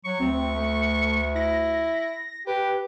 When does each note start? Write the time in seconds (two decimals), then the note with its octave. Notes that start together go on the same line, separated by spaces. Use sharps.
0.05 F#3 C#6
0.20 D2 C4
0.55 A3
1.35 E4 A#6
2.47 G4 B4